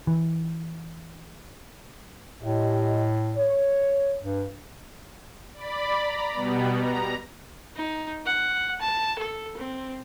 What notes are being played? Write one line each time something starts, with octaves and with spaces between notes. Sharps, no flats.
E3
A2 G3 G4 D#5
C#5
G2
D5 B5
A#5
B2 G3 B3
A#5
D#4
F#5
A5
A4
C4